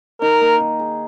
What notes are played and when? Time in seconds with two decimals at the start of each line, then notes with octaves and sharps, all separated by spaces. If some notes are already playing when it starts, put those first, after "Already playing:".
0.22 D#4 A#4
0.41 A#3
0.60 D#3
0.79 G#4